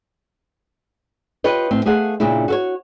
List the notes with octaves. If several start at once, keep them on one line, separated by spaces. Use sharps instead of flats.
F4 G4 B4 C#5 D#5
A2 C4
A3 G#4 F5 F#5
A#2 C#3 D4 E4
F#4 A4 C#5